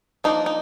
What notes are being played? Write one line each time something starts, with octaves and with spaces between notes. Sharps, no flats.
F3 A#3 D4 D#4
D#4